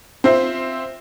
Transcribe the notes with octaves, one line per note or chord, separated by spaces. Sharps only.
C4 F4 C5 E5